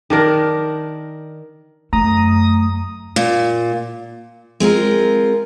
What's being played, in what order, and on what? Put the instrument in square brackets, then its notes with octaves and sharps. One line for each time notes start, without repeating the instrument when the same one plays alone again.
[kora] D#3 D4 A#4
[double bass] F#2 [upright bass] A3 [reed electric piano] A#5 [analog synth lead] D#6
[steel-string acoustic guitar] A#2
G#3 C4 F4 A#4